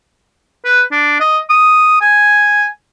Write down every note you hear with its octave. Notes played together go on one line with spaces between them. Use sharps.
B4
D4
D#5
D#6
G#5